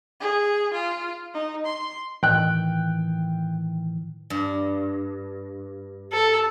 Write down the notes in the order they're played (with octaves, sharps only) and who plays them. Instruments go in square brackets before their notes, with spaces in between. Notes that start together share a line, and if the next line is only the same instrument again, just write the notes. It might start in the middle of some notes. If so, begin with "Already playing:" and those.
[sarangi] G#4
F4
D#4
C6
[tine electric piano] A2 D#3 E3 [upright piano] G5 F#6
[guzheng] G2
[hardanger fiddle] A4